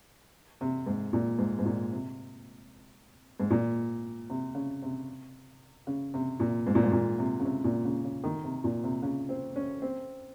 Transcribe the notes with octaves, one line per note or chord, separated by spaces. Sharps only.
C3
G#2
A#2
G#2
G#2
A#2
C3
G#2
A#2
C3
C#3
C3
C#3
C3
A#2
G#2
A#2
G#2
A#2
C3
C#3
C3
A#2
C#3
C#3
D#3
C3
A#2
C3
C#3
C4
C#4
C4